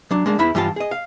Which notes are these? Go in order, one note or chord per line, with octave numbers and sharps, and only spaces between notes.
F#3 D4
G#3 A#3 D4
E2 E3 E4 B5
G2 E3 F4 F5 A5
G#4 D#5
F5